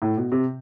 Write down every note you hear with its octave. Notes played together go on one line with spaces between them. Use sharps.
A2
B2
C3